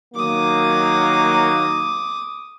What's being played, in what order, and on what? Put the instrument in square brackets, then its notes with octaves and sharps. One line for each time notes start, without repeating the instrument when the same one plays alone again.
[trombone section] D#3 F#3 A#3 [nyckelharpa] D6 D#6